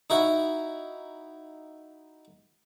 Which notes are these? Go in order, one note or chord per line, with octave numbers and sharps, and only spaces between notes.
D#4 E4 F#4